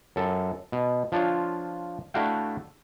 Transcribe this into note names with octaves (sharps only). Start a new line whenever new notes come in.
F#2 A4
B2
F3 D4 F4 C#5
A3 D4 E4 F#4 F5 G5